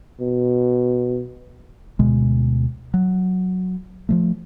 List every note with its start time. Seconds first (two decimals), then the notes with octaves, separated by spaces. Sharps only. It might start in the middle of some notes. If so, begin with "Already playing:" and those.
0.20 B2
1.99 D2 B2 G#3
2.94 F#3
4.09 F3 F#3 A3